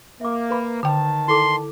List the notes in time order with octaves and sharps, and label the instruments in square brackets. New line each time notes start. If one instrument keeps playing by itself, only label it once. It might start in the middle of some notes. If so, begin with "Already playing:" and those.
[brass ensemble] A#3 [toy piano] E5 D6
[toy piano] B4 B5
[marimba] D3 G5 [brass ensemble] D#3 A5
[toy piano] E4 A4 D6 [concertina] C6